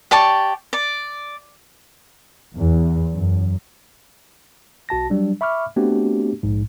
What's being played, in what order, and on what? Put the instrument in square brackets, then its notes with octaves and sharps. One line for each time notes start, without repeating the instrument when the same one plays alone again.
[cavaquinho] G4 D5 A5 C#6
D5
[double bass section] E2
F#2
[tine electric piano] B1 F#4 A5 A#6
F#3 G3 D4
E5 B5 C#6 D6 F6
A3 B3 C4 D4 F#4 G4
A#1 G#2